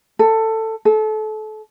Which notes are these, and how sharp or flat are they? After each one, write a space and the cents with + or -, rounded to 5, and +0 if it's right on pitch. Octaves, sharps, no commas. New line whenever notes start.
A4 +15
A4 -30